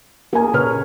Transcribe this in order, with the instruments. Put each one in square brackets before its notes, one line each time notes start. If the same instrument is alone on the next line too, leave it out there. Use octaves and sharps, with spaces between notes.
[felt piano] A#3 G#5 [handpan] G#4 A#4
[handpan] A#2 C#3 C#5 [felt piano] B4 F6